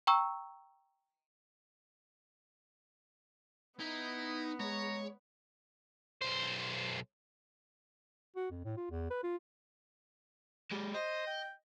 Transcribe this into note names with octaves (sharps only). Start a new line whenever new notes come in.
G5 A#5 C#6 E6
B3 D#4 E4
G#3 C#5 A#5
B1 C5
F#4
F2
A2
F4
E2
B4
F4
G#3 G4
C5 D#5
G5